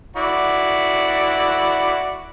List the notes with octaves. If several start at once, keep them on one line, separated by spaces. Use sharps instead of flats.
E4 F#4 D5